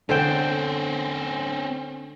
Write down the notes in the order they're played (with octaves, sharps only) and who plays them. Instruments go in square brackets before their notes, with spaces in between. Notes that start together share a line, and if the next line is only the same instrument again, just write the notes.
[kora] D3 C5 G5 [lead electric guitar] C4 C#4